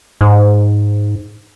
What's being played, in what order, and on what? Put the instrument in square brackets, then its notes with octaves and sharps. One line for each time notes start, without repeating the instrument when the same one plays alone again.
[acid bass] G#2